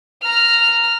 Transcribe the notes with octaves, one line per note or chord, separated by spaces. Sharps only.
A#5 F6